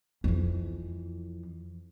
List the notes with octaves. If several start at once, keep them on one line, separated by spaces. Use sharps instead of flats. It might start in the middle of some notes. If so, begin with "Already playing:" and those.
F2 E3